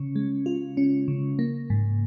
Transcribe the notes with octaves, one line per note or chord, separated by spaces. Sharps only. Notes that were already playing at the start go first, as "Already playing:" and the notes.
Already playing: C#3 C#4
G#3
F4
C#4
C#3
A#3
G#2